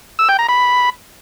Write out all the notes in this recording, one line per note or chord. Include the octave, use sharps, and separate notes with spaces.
E6
G5
A#5
B5